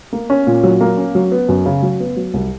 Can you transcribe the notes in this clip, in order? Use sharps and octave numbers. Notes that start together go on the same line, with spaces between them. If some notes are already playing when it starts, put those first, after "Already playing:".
A#3
C#4
A#2
F#3
A#3
C#4
F#3
B3
F#2
C#3
F#3
B3
F#3
C2